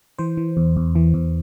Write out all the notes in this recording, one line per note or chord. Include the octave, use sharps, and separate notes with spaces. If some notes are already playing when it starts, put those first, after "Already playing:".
E3 C5
E3
E2
E2
E3
E2